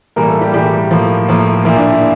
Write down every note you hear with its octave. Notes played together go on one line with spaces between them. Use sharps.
A2 E3 G3 A#3 A#4
A3 A4
G3 G4
A2 E3 G3 A#3 G4
A2 F3 A#3
A2 F3 A#3
A#2 F3 A#3 E4
D4
E4